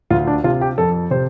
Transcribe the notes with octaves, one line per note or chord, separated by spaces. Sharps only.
D2 F4
D4
C3 F4
G4
F2 A4
C3 C5